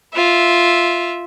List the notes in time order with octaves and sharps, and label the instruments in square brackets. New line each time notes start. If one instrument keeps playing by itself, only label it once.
[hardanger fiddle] F4 E5